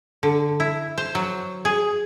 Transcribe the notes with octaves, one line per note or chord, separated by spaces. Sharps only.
D3
E4
C5
F#3
G#4